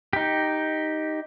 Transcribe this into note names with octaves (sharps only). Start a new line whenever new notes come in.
D#4 G4